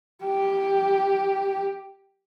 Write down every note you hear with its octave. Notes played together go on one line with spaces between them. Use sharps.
G4